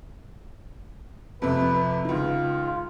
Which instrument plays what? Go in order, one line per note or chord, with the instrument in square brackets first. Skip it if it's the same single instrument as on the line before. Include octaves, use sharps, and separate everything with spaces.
[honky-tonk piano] F2 C3 [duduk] B4
[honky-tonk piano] C#2 D#3 [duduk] F4